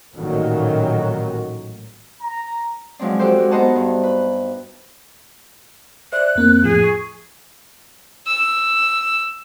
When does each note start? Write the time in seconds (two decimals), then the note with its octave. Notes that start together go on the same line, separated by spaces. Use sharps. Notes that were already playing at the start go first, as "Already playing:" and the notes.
0.14 A1 A#2 D#3 F#3
2.21 A#5
2.99 F3 F#3 G#3 C4 D4
3.19 F#4 G4 A4 C5
3.38 G#3 F#4
3.51 B3 D#4 C5 D#5 F#5 A5
3.75 G2
4.04 B4
6.12 C5 D5 E5 F#6
6.35 F2 A#3 C4
6.64 F2 A2 F3 G#4
6.84 C#6
8.27 E6